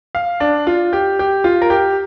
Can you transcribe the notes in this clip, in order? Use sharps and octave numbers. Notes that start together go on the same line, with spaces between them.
F5
D4
F4
G4
G4
F4
A#4
G4